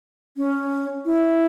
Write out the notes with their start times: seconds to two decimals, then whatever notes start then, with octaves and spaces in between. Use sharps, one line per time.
0.37 C#4
1.05 E4